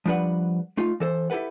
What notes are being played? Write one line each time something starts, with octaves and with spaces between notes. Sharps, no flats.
F3 G3 D4 B4 F#5
A3 D#4 F4
E3 A4 C5
E4 G4 A4 B4 F#5